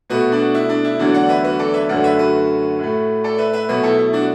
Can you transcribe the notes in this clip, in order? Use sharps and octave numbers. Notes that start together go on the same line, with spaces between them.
B2 A3 F#4 B4
D4 F#4
E4
D4
E4
E2 D3 F#3 A3 D4 F#4
D5 F#5
B4 E5
F#4 B4
A4 D5
B4 E5
F#2 D3 F#3 A3 D5 F#5
B4 E5
F#4 B4
A2 A3
A4 D5
B4 E5
B4 E5
B2 F#3 A3 F#4 B4
E4 A4
E4
D4 F#4